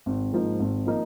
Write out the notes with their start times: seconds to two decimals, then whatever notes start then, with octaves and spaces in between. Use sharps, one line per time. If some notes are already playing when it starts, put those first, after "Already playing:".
0.06 G#1
0.32 G#2 F3 A#3 D#4
0.60 G#1
0.86 F3 A#3 D#4